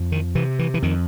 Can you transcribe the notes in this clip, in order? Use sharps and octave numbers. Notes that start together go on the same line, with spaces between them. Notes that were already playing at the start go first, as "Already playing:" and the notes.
Already playing: F2
D#3
C3 E3
E3
E3
F2 D#3